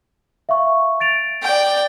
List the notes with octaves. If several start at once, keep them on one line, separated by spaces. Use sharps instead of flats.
E5 F5 C#6
A6 D7 F7
D5 G5